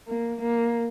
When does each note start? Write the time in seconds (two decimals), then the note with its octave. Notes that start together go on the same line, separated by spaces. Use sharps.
0.08 A#3
0.41 A#3